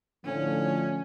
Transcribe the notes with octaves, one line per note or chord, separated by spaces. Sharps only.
A2 D3 F3 C#4